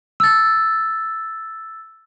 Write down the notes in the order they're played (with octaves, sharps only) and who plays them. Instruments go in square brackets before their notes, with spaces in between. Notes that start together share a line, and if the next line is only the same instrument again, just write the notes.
[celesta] E6 A6